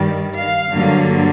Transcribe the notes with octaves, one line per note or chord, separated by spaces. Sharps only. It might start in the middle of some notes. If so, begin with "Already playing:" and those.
Already playing: G2 D#3 G3
F5
G2 D3 F#3 A#3